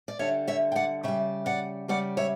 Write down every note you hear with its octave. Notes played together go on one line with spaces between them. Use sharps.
D5
D3 G3 C#5 E5
C#5 E5
G5
D5 F#5
C#3 G3 E5 G5
D5 F#5
C#3 G3 D5 F#5
C#5 E5